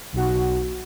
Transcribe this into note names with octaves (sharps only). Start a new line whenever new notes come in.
B1 F#4